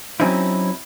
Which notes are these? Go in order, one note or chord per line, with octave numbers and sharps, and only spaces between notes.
F#3 C4 C#4 D#4 E4